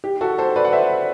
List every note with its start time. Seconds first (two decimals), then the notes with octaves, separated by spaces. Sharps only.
0.04 G4
0.21 F#4 A4
0.38 A4 C5
0.56 B4 D5
0.65 F#5
0.72 C5 E5